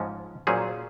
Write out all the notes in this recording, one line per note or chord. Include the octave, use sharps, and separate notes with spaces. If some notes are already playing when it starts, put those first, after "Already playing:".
Already playing: G#2 F3 G#3 C#4
A#2 F#3 C#4 G#4 C5